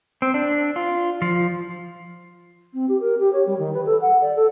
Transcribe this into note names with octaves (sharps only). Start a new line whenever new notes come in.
C4
D4
F4
F3
C4
G4
A#4
G4
C#5
G3
D#3
B4
A4
F#5
D5
A4